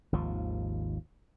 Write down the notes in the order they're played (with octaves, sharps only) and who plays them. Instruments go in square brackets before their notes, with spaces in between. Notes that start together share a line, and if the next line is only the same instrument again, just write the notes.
[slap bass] G#1 D#2 F3